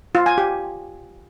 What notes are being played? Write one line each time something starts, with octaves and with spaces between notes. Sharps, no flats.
F4
G#5
G4